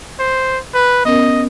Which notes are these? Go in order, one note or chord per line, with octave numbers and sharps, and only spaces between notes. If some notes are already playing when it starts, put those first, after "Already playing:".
C5
B4
B3 C#4 A#4 D#5